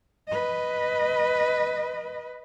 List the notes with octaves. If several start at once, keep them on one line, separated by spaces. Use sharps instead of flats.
B4 D#5